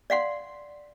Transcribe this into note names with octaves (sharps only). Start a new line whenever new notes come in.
D5 F5 F#5 C6